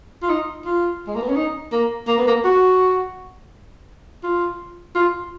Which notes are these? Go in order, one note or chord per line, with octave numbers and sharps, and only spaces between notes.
F4
D#4
F4
G#3
A#3
B3
C#4
D#4
A#3
A#3
B3
A#3
F#4
F4
F4